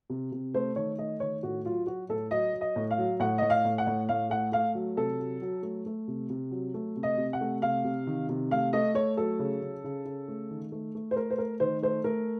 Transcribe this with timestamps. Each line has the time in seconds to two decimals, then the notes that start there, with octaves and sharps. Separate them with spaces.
0.10 C3
0.32 C3
0.54 A3 C5
0.76 D#3 C#5
0.98 A3 D#5
1.20 D#3 C#5
1.43 A2 F#4
1.65 F#3 F4
1.87 F#3 F#4
2.09 A2 A4
2.31 F#3 D#5
2.53 F#3
2.61 D#5
2.76 A2
2.91 F5
2.98 F#3
3.20 A2 F#5
3.38 A2 D#5
3.50 F5
3.65 A2
3.78 F#5
3.87 A2
4.09 A2 F5
4.30 A3 F#5
4.52 A3 F5
4.75 F#3
4.97 C3 A4
5.20 F#3
5.42 F#3
5.63 A3
5.86 A3
6.08 C3
6.30 C3
6.51 F#3
6.74 A3
6.96 C3
7.03 D#5
7.17 C3
7.33 F#5
7.41 A3
7.62 C3 F5
7.84 C3
8.07 D#3
8.29 C3
8.51 A3 F5
8.73 A3 D#5
8.95 A3 C#5
9.17 F#3 A4
9.39 C#3
9.61 C#3
9.84 C#3
10.05 C#3
10.28 A3
10.51 D#3
10.72 A3
10.95 A3
11.11 C5
11.16 A3 A#4
11.30 C5
11.38 A3 A#4
11.60 D#3 C5
11.82 A3 C5
12.04 A3 A#4